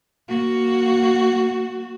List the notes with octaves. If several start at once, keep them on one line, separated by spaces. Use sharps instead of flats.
A#3 F#4